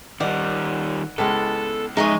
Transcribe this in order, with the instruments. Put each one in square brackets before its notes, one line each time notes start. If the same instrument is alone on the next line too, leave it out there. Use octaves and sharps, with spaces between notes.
[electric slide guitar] D#3 G3 [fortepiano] D#4 [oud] D5 [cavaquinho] F#5
[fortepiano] C#2 G#3 [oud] B3 E4 [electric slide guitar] A4
[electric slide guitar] C#3 F3 E5 [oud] G#3 [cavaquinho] D#4 G#4 C#5